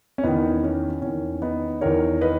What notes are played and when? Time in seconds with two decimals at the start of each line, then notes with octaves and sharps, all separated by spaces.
0.18 C#4
0.23 E2 D#3 B3 D#4
0.64 C#4
1.02 E2 D#3 C#4
1.42 B3 D#4
1.81 E2 D#3 A#4 C#5
2.21 B4 D#5